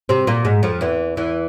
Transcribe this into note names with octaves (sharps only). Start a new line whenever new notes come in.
C3 C4
A#2 A#3
G#2 G#3
F2 F3
E2 E3
E2 E3